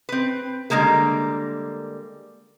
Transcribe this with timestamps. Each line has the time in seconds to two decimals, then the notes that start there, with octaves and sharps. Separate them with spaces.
0.09 C4 B4
0.70 D3 G3 G#3 A#3 A#4